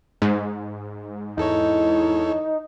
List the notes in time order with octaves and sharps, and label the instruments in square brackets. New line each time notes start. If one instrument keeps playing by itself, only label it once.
[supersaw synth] G#2
[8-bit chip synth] E2 A4 C#5 [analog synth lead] D#4 [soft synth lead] E4